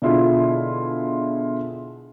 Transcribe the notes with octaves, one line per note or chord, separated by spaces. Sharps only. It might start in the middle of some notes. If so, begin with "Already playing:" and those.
B2 D3 E4 F4 G#4